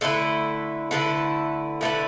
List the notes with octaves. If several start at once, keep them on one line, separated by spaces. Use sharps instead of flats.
D3 A3 E4 B4
D3 A3 E4 B4
D3 A3 E4 B4